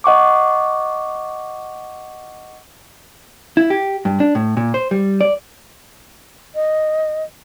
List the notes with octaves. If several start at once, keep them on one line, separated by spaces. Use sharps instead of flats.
D#5 F#5 C#6 D6
E4
G4
G2
D4
A2
A#2
C5
G3
D5
D#5